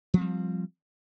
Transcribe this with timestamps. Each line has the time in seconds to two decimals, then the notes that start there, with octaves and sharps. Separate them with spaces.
0.14 F3
0.17 C4
0.21 G3